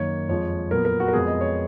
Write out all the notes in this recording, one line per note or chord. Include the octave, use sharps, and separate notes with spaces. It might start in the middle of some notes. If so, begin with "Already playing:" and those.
Already playing: F#2 D#3 A#3 C#5
F2 F3 G#3 C#5
A#2 F#3 B3 A#4
A#4
F#4
A#4
F2 F3 G#3 B3 G#4
D#5
C#5